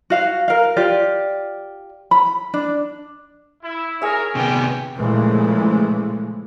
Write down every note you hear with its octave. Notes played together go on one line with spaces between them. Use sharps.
F#4 F5 F#5
A#4 F5
F4 G4 D5
B5
D4
E4
G#4 A#4 C#5 E5
C3 D#3 G3 B3 G5
A#2 C#3 E3 F3 G#3 A3